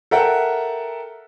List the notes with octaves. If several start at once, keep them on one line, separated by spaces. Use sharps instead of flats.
A4 A#4 E5 F#5 G5